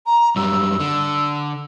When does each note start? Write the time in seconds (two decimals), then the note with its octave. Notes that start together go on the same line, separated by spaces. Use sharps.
0.06 A#5
0.36 F#2 G3 E6
0.80 D3